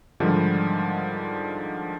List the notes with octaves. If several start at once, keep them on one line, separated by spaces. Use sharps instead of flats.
G#2 D3 D#3 F3 G3